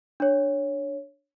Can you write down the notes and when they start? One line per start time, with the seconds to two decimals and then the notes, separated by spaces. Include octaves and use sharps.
0.20 D4 C#5